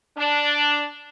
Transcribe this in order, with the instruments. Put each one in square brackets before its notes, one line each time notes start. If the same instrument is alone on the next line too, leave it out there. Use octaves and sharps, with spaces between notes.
[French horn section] D4